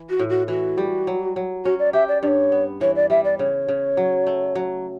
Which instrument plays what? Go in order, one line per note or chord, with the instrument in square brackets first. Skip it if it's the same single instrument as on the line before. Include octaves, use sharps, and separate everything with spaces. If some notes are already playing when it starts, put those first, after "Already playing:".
Already playing: [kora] E3
[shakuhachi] F#4
[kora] A2
[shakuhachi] F#4
[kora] E3 [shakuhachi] F#4
[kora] G3
F#3
F#3
[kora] C#4 [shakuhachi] F#4
[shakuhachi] D5
[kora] G4 [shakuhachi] E5
[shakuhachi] D5
[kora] G2 [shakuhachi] C#5 D5
[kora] B3
[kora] E3 [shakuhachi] C#5
[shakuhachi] D5
[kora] G3 [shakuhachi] E5
[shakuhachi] D5
[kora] C#3 [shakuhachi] C#5
[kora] C#3
F#3
A3
F#3